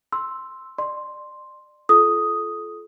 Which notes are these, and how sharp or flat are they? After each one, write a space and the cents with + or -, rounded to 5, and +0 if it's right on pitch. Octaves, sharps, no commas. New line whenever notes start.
C6 +0 E6 +0
D5 +30 C6 +0
F4 -25 A4 -30 D#6 +0